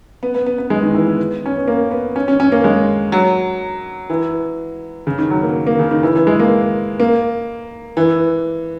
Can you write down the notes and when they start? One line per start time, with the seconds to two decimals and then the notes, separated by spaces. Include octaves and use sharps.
0.23 B3
0.35 B3
0.46 B3
0.58 B3
0.70 G#3
0.83 D#3
0.95 E3
1.07 B3
1.46 C#4
1.57 B3
1.68 A#3
1.91 B3
2.16 C#4
2.28 C#4
2.40 C#4
2.52 A#3
2.64 G#3
3.12 F#3
4.10 E3
5.07 C#3
5.18 D#3
5.30 F#3
5.43 A#3
5.67 A#3
5.79 C#3
5.91 D#3
6.03 E3
6.15 E3
6.27 G#3
6.40 A#3
7.00 A#3
7.97 E3